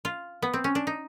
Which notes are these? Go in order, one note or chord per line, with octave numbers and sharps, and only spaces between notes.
F4
B3
C4
C#4
D4
D#4